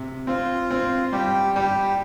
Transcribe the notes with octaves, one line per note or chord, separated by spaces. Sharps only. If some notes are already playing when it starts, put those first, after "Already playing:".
Already playing: C3
C4 F4
C4
G3 G4
G3 G4